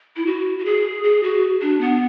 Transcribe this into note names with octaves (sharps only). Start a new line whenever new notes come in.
E4
F#4
F#4
G#4
G#4
F#4
D4
B3